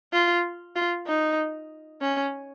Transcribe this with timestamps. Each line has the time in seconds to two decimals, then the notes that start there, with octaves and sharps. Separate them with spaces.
0.13 F4
0.76 F4
1.07 D#4
2.01 C#4